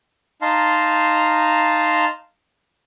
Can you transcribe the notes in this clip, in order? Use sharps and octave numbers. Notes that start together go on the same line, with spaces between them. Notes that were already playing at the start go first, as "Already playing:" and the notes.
D#4 F5 A5 A#5 C6